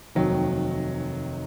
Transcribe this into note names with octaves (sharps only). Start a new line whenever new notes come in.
F1 D#2 D#3 F#3